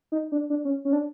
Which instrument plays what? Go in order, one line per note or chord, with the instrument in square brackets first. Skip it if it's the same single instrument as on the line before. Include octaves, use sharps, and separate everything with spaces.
[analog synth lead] D#4
D4
D4
C#4
C#4
D4